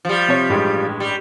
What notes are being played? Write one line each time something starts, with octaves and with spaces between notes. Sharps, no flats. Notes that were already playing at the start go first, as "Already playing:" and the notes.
F3 G3
C3 C#5
A1 G2 G#3
G3